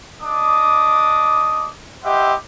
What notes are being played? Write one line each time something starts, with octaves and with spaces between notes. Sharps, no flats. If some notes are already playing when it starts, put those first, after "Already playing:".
D4 D#5 D6 D#6
E4 G4 C5 D#5 E5 F#5